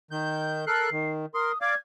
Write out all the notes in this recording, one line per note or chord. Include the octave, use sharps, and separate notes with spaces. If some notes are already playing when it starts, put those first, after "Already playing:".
D#3 G6
A4 A#4 F#6 C7
D#3
A#4 C6 D#6
D5 F5 D6 G#6